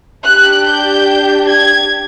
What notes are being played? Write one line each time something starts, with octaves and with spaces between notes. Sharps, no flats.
D4 G4 F#6
G6
G#6